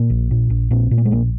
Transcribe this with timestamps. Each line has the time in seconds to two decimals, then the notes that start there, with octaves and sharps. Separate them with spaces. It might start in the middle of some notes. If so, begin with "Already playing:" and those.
Already playing: A#2 A#3
0.10 A#1
0.31 A#2
0.50 A#1
0.71 A#2 C4
0.91 A#2
0.98 A#3
1.05 G#3
1.11 A#1 A#3